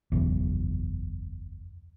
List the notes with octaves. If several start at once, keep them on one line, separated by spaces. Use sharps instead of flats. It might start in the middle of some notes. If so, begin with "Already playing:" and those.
F#1 B1 E2